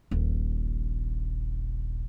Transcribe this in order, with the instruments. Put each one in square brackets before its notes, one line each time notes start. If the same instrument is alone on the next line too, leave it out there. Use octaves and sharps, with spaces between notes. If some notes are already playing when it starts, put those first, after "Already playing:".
[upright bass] D#1 A#1